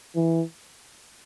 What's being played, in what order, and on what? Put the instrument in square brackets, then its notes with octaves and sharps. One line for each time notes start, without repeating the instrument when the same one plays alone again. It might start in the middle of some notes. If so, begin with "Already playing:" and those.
[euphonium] E3